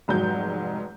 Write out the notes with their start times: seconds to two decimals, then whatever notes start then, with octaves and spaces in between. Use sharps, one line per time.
0.08 F1 G#2 F#3 G6